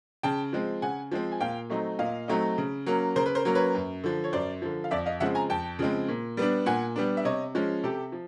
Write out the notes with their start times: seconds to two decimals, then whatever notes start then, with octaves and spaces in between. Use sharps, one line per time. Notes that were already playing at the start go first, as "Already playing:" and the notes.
0.23 C#3 G5 A5
0.53 F3 G#3 C4
0.82 C#3 F#5 G#5
1.11 F3 G#3 C4
1.32 G#5
1.41 A#2 F5 G5
1.70 F#3 A3 C4 D#4
1.99 A#2 D#5 F5
2.28 F#3 A3 C4 D#4
2.58 C#3
2.86 F#3 A#3 C#4
3.16 C#3 A#4 C5
3.26 B4
3.35 A#4 C5
3.45 F#3 A#3 C#4
3.55 B4 C#5
3.75 F#2
4.04 D3 F3
4.24 C#5
4.33 F#2 C5 D5
4.62 D3 F3
4.84 F5
4.91 F2 D5 E5
5.06 D#5 F5
5.20 C#3 F3 G#3 C4 E5 F#5
5.35 G#5 A#5
5.50 F2 G5 A5
5.79 C#3 F3 G#3 C4
6.08 A#2
6.37 G3 B3 D4
6.66 A#2 F#5 G#5
6.96 G3 B3 D4
7.17 E5
7.25 C3 C#5 D#5
7.55 F3 G#3 C#4
7.83 C3 G4 A4
8.12 F3